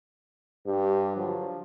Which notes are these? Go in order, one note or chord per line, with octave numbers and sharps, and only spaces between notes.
G2 G4
D3 F3 F#3